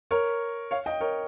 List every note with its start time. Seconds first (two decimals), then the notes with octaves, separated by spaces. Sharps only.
0.11 A#4 C#5
0.71 C#5 F5
0.86 D#5 G5
1.00 A#4 C#5